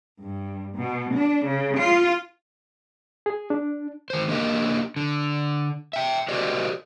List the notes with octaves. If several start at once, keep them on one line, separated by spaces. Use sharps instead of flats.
G2
B2
D4
C#3
F4
G#4
D4
D#3 C5
A#3 D4 G4 A#4 D#5
D3
E5 G5
F#4 G4 A#4 C5 D5 D#5